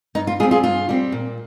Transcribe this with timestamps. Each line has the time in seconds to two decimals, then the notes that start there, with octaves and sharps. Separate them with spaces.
0.15 G2 D#4
0.27 F4
0.40 G3 F4 G#4
0.43 C4
0.51 F4 G#4
0.63 G2 F4
0.89 G3 C4
1.12 A#2